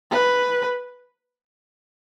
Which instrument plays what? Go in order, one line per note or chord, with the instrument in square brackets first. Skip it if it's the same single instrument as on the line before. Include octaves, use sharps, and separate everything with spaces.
[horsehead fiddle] B4